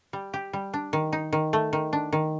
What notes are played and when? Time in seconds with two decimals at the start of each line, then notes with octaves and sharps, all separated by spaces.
0.13 G3
0.34 G4
0.53 G3
0.74 D4
0.93 D#3
1.13 D#4
1.33 D#3
1.53 A3
1.73 D#3
1.93 D4
2.13 D#3